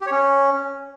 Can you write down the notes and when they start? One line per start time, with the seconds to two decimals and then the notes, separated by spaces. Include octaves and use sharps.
0.01 G4
0.06 C#5
0.11 C#4